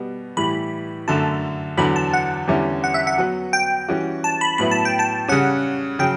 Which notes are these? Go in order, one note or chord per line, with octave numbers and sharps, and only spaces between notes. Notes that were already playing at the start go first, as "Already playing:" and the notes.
Already playing: B2 G3 B3
A2 E3 G3 B5
F#2 D3 A3 A5
E2 D3 F#3 B5
A5
F#5
E2 D3 G3 C#4 E4
F#5
E5
F#5
F#3 B3 F#4 B4
G5
E3 G3 C#4 F#4
A5
B5
A2 F#3 B3 E4 B5
A5
G5
A5
C#3 G3 C#4 F#5
C#3 F#3 G5